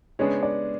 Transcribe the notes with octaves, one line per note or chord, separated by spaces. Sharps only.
C#3 G#3 B3 D4 G#4 C#5
D5